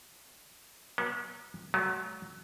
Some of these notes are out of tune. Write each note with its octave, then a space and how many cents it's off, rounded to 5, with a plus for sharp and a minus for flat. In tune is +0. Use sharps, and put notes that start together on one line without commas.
F#3 +0 B3 -40
F#3 +15 A3 -40